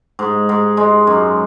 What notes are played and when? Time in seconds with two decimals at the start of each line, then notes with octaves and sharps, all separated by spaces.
0.19 G#2
0.49 G#2
0.77 G#3
1.07 F#2